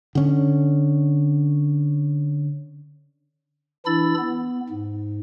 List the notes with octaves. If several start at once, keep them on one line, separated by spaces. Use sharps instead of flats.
D3 C#4
E3 D4 E4 B5 E6 A6
B3
G#2